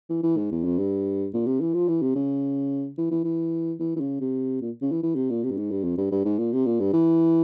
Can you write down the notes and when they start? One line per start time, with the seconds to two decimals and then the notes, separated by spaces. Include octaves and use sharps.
0.10 E3
0.23 E3
0.37 G#2
0.51 E2
0.65 F2
0.79 G2
1.33 A#2
1.46 C3
1.61 E3
1.74 F3
1.88 E3
2.02 C3
2.15 C#3
2.98 E3
3.11 E3
3.24 E3
3.80 E3
3.96 E3
4.00 C#3
4.20 C3
4.61 A#2
4.82 C#3
4.91 E3
5.03 E3
5.16 C3
5.30 A#2
5.43 C3
5.51 G2
5.57 G#2
5.71 G2
5.84 F2
5.98 G2
6.11 G2
6.25 G#2
6.39 A#2
6.53 C3
6.66 A#2
6.80 G2
6.93 E3